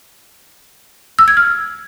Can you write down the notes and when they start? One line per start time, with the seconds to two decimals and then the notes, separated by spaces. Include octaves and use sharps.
1.19 E6
1.28 G#6
1.37 F6